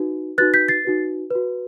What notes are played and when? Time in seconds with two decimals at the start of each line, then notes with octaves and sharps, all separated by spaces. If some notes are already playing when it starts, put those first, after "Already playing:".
Already playing: D#4 F#4 B4
0.38 D#4 F#4 B4 F#6 A6
0.54 G6 B6
0.68 A6 C7
0.85 D#4 F#4 B4
1.31 F#4 B4